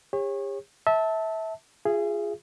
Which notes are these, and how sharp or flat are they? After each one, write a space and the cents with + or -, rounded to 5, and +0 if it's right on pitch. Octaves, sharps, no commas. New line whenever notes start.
G4 +45 C#5 -25
E5 -25 A5 +0
F4 +0 G#4 -5 E5 +40